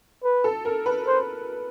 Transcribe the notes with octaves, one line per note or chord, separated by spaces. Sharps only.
B4
A4
A#4
B4
C5